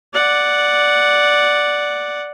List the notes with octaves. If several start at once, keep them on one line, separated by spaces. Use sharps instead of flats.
D5 F#5